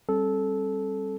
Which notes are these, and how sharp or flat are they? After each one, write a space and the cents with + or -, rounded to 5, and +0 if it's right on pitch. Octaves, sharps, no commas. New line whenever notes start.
G3 +0 C4 +45 A4 -15